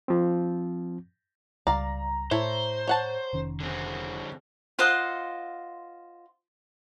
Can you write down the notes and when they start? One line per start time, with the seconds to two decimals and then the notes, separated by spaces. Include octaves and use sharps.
0.08 F3 C4
1.67 C#2 G3 D5 F5 A#5
2.31 A2 E4 A4 C5 C#5
2.87 C#5 F#5 A5
3.33 F1 D#3 C#4
3.60 D3 C4
4.79 F4 C5 D#5 F#5